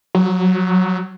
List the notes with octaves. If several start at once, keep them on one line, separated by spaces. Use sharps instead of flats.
F#3